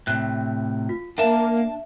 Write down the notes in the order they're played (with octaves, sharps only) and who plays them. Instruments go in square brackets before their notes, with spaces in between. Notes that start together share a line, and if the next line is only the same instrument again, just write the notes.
[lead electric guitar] A2 C3 [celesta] F#6
[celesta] F4
[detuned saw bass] A#3 [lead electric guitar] D4 A5 [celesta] E5